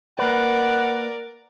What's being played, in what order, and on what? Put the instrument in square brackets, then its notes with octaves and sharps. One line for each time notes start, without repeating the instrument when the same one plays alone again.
[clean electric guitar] A#3 B4 [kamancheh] A#4 D5 [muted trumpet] F#5